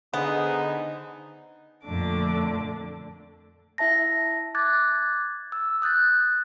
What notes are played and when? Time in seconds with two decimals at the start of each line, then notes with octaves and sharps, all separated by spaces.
0.14 D3 B3 D#4 G#4 C5
1.85 F2 A#2 D3 A3 D4 D6
3.78 E4 E5 A5 A#6
4.55 D6 F#6 G#6 A6
5.52 E6
5.82 D#6 F#6 G6 A6